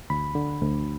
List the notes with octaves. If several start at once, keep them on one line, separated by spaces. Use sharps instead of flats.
D2 B5
D3
D2